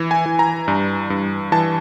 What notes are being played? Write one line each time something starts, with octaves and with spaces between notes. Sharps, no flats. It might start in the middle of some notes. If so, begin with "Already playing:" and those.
Already playing: E3
G#5
E3
A#5
G2
G2
E3 A5